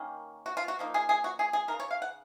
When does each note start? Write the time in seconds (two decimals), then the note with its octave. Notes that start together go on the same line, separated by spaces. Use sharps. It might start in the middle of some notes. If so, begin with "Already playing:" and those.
Already playing: D#3 A#3 C#4
0.46 F#4
0.57 F4
0.68 F#4
0.79 F3 A#3 D#4
0.94 G#4
1.09 G#4
1.24 F#4
1.39 G#4
1.53 G#4
1.68 C#3 G#3 D#4 A#4
1.80 C#5
1.91 F5
2.02 F#5